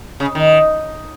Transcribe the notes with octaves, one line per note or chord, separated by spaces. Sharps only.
C#3
D#3